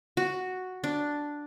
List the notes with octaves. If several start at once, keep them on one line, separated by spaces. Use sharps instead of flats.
F#4
D4